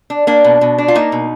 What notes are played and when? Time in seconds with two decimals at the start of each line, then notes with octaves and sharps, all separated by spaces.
0.10 D4
0.27 A#3 D4
0.44 B2
0.61 B2
0.78 D4
0.88 F4
0.95 A#3 D#4
1.12 B2